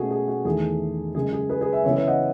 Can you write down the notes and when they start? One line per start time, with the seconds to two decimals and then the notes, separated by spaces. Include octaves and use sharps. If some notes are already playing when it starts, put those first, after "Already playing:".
Already playing: B2 A3 C#4 F#4 G#4
0.11 G#4
0.28 F#4
0.45 E2 D#3 A3 G#4
1.14 F#2 C#3 G#3 G#4
1.32 G#4
1.49 G#4 B4
1.61 G#4 B4
1.73 E5 G#5
1.84 F#2 C#3 E3 B3 C#5 E5
1.96 C#5 E5
2.07 D#5 F#5